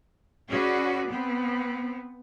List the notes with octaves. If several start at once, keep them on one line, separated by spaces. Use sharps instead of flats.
C#4 F#4 G#4 B4 D5
B3 C4